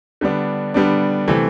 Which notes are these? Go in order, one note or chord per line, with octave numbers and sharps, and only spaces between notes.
D3 G3 B3 D4
D3 G3 B3 D4
C3 E3 A3 C4